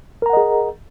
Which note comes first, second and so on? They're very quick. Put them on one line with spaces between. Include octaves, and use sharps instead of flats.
A#4 A#5 F#5 D#5 G#4